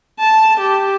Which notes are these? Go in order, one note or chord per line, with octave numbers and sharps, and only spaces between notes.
A5
G4